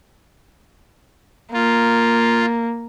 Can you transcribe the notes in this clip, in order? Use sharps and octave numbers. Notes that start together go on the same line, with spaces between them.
A#3 F4